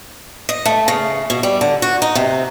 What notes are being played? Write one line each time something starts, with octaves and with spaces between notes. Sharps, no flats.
D#5
A3
C#3
B2
G3
D3
F#4
D#4
C3